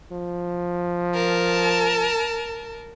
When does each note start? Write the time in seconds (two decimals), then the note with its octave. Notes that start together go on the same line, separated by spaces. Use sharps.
0.12 F3
1.14 A#4 A5